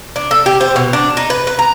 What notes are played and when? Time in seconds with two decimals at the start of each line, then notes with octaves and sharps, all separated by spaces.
0.16 D4
0.31 A4
0.46 G4
0.61 C5
0.76 B2
0.93 D4
1.17 D#4
1.30 B4
1.47 B4
1.59 A#5